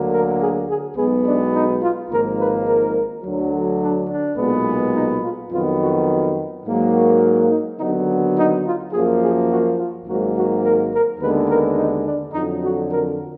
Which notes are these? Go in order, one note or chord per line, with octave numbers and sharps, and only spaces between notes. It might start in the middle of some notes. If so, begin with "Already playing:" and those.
Already playing: D2 D3 F#3 A#3
A#4
G#4
G#4
B1 B2 G#3 B3 G#4
D4
D#4
F4
G#1 G#2 F3 A#3 A#4
B4
A#4
D2 D3 F#3
D4
D4
B1 A#2 G#3 B3
D#4
F4
F2 D#3 F#3 B3 F4
F#4
G#2 F#3 A#3
F#4
D#4
D#2 D3 F#3 B3 D#4
D#4
F4
F#2 F3 A#3 G#4
G#4
F#4
F4
G#1 G#2 F#3 A#3 F#4
F#4
A#4
A#4
D#2 D3 G#3 B3 B4
A#4
D#4
D4
F2 D3 F#3 D#4
F#4
A#4